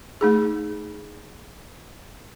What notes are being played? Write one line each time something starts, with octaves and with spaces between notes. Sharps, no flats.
A3 D#4 G#4